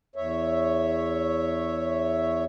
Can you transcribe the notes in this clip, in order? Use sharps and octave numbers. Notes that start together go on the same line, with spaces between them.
E2 C#5 E5